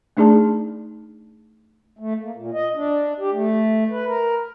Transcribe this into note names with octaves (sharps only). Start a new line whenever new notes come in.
A3 D4 D#4 G#4 D5 A5
A3
A#3
A#2
D#5
D4
G4
A3
B4
A#4